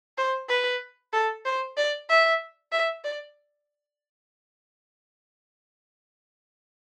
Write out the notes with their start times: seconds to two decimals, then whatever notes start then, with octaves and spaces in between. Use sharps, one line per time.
0.18 C5
0.49 B4
1.13 A4
1.45 C5
1.77 D5
2.09 E5
2.72 E5
3.04 D5